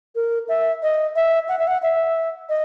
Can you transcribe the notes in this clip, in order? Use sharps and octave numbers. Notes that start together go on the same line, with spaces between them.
A#4
E5
D#5
E5
F#5
E5
F#5
E5
D#5